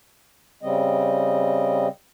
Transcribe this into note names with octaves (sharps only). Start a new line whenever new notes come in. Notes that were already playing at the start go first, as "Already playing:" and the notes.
C#3 G3 C4 D#5